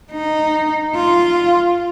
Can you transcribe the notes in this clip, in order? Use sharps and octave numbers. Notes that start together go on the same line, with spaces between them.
D#4
F4